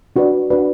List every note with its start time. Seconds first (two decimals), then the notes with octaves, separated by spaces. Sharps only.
0.16 D4 F#4 B4 D5
0.50 D4 F#4 B4 D5